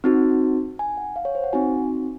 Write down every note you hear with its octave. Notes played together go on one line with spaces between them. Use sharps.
C4 D#4 F#4
G#5
F#5
F5
C#5
C5
F#5
C4 D#4 F#4 G#5